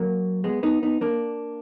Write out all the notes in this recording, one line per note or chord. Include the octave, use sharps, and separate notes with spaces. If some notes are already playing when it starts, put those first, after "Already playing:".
Already playing: F#3 A#3
G#3 B3
B3 D#4
B3 D#4
A#3 D4